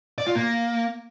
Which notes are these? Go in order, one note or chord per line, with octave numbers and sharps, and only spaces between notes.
D5
F4
A#3